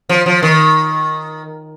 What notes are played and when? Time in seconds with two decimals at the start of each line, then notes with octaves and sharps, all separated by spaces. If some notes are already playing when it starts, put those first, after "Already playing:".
0.09 F3
0.26 F3
0.42 D#3